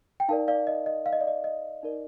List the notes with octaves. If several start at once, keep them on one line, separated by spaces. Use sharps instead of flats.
G5
D#4 A#4 D5 F5 A5
D5 F5
D#5
D#5
F5
D#5
D5
D#5
D#5
D#4 A#4 D5